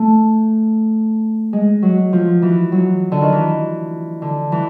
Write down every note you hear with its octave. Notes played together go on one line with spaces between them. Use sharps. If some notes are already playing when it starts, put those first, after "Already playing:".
Already playing: A3
G#3
F#3
F3
E3
F#3
D3
D#3
E3
D3
E3